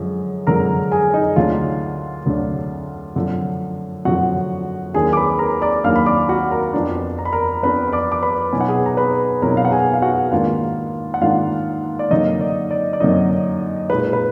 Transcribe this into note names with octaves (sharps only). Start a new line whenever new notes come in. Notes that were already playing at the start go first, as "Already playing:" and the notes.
Already playing: F#2 D3 F3 G#3
F#2 D3 F3 G#3 A#4 A#5
G#4 G#5
D#4 D#5
D2 D3 F#3 D4 F4 F5
D2 D3 F#3 D4
F#2 D3 F3
F#2 D3 F3 F#4 F#5
D#2 D#3 F#3 A#3 D4 G#4 G#5
D6
B4 B5
A#4 A#5
D5 D6
D#2 D#3 F#3 A#3 D4 F5 F6
B5
D5 D6
F#4 F#5
A#4 A#5
F2 F3 B3 D4
A#5
B5
A#4 A#5
F2 F3 B3 D4 B4 B5
B5
D5 D6
D6
B4 B5
B2 F#3 B3 D#4 G#5
F#5
G#4 G#5
A#5
B4 B5
B2 F#3 B3 D#4 A#4 A#5
F5
F#5
G#4 G#5
F5
F#4 F#5
G#2 D#3 A#3 D4 F4 F5
F#5
G#2 D#3 A#3 D4 F4 F5
D5
F#2 D3 F#3 A#3 D#4 D#5
D5
D5
D5
F#2 D3 F#3 A#3 D#4 D#5
A#2 G#3 D#4 B4
B4